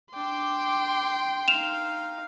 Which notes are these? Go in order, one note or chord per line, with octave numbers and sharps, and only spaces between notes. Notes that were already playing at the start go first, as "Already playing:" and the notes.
D4 G5 C6 D6
D#4 F5 E7 F7